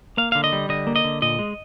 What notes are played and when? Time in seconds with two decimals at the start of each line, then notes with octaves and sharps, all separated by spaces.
0.17 A#3 F5
0.32 D3 F5
0.44 D#5
0.53 G3
0.69 D3 D#5
0.87 A#3
0.96 D#5
1.04 D3
1.22 A#2 D#5
1.39 G#3